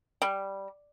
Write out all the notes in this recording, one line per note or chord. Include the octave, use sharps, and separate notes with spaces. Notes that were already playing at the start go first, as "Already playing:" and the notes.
G3